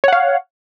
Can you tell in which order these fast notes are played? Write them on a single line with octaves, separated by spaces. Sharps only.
C#5 F#5 F5